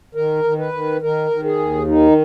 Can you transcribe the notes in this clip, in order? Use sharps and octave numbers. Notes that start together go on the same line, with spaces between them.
D#3 A#4
D#3
B4
D#3
D#3 A#4
D#3
G#4
D#2
D#3 D#4